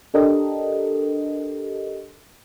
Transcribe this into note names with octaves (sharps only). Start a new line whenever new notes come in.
D4 G4 A4 A#4 D#5